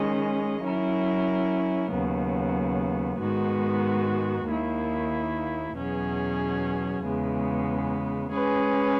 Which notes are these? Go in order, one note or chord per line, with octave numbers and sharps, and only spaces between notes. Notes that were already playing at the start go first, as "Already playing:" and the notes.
Already playing: D#3 G#3 C#4 G#4 D#5
F#3 C#4 E4 A#4
D#2 C#3 F#3 B3
G#2 D#3 G#3 B3 F#4
D#2 D#3 A#3 E4
E2 B2 F#3 C#4 G#4
E2 C#3 G#3 B3
G#3 C#4 G#4 B4